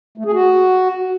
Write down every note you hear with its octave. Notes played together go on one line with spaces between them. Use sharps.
A3
G#4
F#4